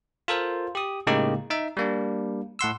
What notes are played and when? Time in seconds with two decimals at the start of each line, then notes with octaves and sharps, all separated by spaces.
0.28 F4 A4 A#4 C5
0.75 G4 D#6
1.07 A2 C#3 G#3 A#3 D#4 G4
1.50 D#4 E5
1.77 G3 A#3 D4
2.59 A2 F#5 C6 E6